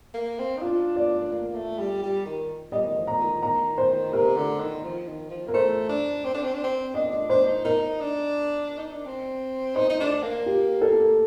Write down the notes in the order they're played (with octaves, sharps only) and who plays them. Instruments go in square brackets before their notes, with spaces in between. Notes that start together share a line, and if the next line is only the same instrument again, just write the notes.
[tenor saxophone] A#3
C4
D#4
[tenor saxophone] D4 [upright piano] F4
[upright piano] D5
[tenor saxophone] A#3
A3
G3
G3
D#3
[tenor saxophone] G3 [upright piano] D#5
[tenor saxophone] D#3
F3
[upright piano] A#5
[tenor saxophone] D#3
[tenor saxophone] D#3 [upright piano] A#5
[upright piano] C5
[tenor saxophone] C3 [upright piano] A#4
[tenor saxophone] D3
D#3
F3
D#3
F3
[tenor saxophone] A#3 [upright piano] A#4
[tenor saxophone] A3 [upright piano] C5
[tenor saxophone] D4
C4
D4
C4
D4
C4
[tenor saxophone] D4 [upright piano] D#5
[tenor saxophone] D4
[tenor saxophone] D4 [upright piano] C5
[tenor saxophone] D#4
[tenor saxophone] D#4 [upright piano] A#4
[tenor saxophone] D4
D#4
D4
C4
[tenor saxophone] D#4 [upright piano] C5
[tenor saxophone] D#4
D4
A#3
[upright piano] G4
A4